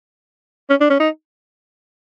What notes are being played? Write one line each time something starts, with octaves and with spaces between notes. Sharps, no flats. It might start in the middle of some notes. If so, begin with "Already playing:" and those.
C#4
D4
C#4
D#4